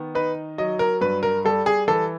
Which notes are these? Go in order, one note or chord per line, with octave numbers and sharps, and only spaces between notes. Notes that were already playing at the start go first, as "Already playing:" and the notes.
Already playing: D#3 B3
D#4 B4
F#3 D#5
A#4
G2 B4
A#4
G3 A4
G#4
E3 A4